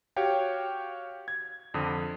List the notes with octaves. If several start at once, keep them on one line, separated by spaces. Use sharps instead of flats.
F#4 G4 C#5 F5 G5
G#6
F2 D3 D#6